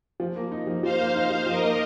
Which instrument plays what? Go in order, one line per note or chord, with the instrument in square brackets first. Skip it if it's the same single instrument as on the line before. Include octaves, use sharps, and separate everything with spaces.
[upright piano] F3
A#3
D#4
F3
[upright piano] F3 [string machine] C5 F5
[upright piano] A#3
D#4
F3
[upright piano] F3 [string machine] A#4 D#5
[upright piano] A#3